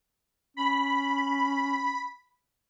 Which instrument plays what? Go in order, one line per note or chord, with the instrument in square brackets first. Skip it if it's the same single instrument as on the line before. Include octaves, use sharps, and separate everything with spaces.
[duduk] C#4 [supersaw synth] B5